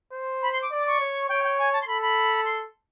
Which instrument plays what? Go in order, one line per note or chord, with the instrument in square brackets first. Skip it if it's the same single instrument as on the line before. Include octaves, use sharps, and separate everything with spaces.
[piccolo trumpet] C5
[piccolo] B5
C6
D6
[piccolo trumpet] D5
[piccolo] D6
C#6
[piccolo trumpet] C#5
[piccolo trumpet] C#5 [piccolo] G5
[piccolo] G5
G#5
A5
C6
[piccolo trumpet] A4 [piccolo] B5
[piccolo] B5
C6